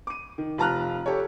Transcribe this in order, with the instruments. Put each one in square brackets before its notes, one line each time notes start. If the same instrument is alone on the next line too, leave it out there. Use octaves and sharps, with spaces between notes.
[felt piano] D6 D#7
D#3
F1 F4 A5 A#5 F6 F#6
G4 A4 C#5